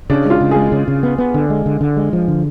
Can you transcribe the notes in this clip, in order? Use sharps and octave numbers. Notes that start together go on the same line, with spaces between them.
C#3 D4
G#3 F4
C#3
G#3 G#4
C#3
C#3
B3
B3
D3
G#3
D3
D3
G#3
F3
D3